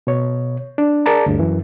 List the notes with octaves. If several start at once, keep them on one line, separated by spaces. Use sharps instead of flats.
B2 C#5
D4
G#4 A#4 D5 A5 A#5
D2 G2
F#2 E3